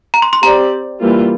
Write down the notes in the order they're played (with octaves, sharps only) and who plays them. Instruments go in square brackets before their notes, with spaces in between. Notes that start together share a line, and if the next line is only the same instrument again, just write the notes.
[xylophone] A#5
C6
C6
[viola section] C4 G4 D5 [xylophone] A#5
[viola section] E3 G3 A#3 F4